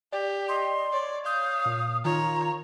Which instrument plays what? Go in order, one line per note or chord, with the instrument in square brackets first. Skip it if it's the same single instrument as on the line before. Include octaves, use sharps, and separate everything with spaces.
[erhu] G4 [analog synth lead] D5
[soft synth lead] D#5 [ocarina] C6
[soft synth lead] C#5 [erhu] D5
[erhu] F5 [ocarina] D#6 [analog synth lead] G6
[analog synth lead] A#2
[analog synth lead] D#3 [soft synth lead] F4 [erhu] C#5 [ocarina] A#5